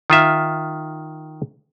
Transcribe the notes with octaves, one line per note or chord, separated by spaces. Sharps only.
D#3 F4 E5